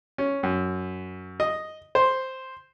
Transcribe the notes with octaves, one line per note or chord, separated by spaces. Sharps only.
C#4
F#2
D#5
C5